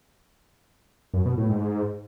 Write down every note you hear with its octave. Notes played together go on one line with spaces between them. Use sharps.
F#2
B2
A2
G#2